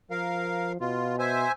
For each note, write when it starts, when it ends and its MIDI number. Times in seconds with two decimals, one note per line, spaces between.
0.11 0.77 53
0.11 0.72 70
0.11 0.72 77
0.81 1.46 47
0.81 1.16 65
1.19 1.52 72
1.19 1.52 76
1.19 1.52 80